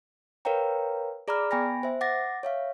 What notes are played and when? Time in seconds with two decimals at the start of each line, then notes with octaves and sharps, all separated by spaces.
0.45 A#4 B4 C#5 F5 G5 A#5
1.28 G#4 D5 A#5 B5 D6 F6
1.51 B3 G5 G#5 B5 A#6
1.83 C5 E5
2.01 F#5 D6 A6 A#6
2.43 C#5 E5 F5